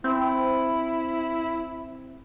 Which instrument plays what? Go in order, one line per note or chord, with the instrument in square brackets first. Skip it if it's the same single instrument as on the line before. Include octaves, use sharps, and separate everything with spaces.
[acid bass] C4 [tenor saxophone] E4